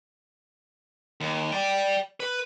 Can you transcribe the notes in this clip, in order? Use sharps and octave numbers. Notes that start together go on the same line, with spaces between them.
D#2
D5 G5
B4